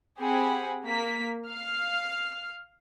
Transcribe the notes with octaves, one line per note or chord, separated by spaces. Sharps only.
C4 G4 G#4 F#5 G#5 B5
A#3 B6
F5 F6